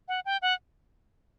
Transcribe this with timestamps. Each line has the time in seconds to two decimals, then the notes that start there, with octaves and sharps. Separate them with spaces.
0.08 F#5
0.25 G5
0.42 F#5